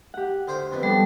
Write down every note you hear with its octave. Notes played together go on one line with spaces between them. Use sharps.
G4 F#5
D2 C5 G5
F2 B2
G3 B3 D4 A4